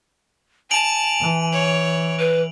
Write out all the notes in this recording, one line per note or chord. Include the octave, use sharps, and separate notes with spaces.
G#5 A5 D7 F7 F#7
E3
C#5
B4